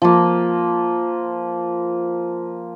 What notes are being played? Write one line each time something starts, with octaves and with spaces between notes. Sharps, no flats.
F3 A#3